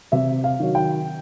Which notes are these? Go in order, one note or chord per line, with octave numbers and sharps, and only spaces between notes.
C3 E5
F5
D#3 F#3
G5